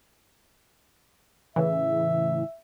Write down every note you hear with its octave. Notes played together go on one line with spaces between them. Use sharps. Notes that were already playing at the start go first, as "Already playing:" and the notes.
A2 C#3 E3 E5